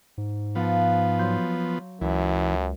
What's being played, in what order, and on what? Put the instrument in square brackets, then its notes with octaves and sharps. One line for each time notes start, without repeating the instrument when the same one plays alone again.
[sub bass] G#2
[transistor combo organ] F3 B3 [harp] F5 F#5 A5
[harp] F#3 C6 G6
[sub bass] C#2 [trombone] F#2 [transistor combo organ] E3